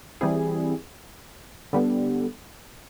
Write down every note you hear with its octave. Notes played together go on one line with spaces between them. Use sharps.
E3 G3 C4 E4 G#4
D3 G3 B3